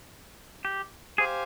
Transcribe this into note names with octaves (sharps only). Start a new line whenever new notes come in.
G4
G4 G#4 C5 F5 G#5